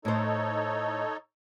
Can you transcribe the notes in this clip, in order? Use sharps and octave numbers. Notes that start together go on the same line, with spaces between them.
A2 D#4 A4 C5 C#5